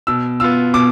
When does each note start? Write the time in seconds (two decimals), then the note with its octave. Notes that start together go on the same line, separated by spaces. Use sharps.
0.07 B2 E6
0.40 B3 F4 E6
0.74 B2 D6